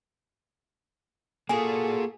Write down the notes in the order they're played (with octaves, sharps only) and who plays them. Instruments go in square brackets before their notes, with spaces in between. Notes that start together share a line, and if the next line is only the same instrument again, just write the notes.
[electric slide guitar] A#3 F4 [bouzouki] F#4 G#4 [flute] A4 [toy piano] G#5